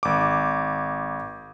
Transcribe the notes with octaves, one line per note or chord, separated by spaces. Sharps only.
G#1 D6